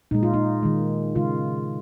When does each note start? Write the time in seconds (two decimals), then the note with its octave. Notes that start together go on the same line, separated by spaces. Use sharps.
0.11 A#2 G#3 D#4
0.23 F4
0.34 D#4
0.63 D#3 G#3
1.15 C#3 G#3 F4